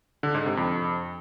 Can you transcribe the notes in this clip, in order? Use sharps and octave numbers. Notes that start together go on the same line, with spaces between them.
D3
G#2
C3
F2